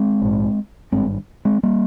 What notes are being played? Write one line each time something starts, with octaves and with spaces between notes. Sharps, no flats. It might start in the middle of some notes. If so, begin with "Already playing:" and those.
Already playing: G#3 C4
A#1 G#2
G#1 G2 G#3 C4
G#3 C4
G3 A#3